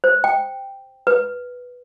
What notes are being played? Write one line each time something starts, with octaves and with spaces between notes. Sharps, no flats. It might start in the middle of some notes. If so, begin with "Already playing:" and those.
C5
G5
B4